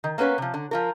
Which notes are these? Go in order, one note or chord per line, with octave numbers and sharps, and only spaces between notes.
D#3
A#3 B3 C#4 B4 C#5
C3 F3
D3
F3 F4 A#4